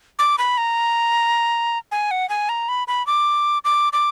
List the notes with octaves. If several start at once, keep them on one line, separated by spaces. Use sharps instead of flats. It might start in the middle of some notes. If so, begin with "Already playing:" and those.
D6
B5
A#5
G#5
F#5
G#5
A#5
B5
B5
D6
D6
D6